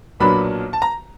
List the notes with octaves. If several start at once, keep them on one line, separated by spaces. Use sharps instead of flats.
B1 A#2 F#3 B3 D4 B5
A5
A#5